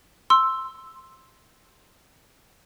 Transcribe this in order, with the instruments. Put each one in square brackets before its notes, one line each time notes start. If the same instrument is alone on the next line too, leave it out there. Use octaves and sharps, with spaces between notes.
[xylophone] C6 E6